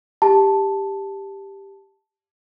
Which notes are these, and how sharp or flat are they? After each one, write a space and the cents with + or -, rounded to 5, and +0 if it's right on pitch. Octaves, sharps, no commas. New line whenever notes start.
G4 +5 A5 +0